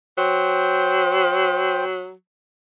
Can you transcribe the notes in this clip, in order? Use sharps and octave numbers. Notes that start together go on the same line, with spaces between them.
F#3 C5 G5